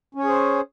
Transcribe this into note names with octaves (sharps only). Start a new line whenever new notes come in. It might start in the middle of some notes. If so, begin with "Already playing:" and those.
C#4 G#4 C5 C#5